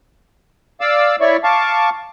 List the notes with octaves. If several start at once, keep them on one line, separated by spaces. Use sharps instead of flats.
D5 F5 D6 E6
E4 C#5 D5 E5 C#6
F5 A5 C#6 D6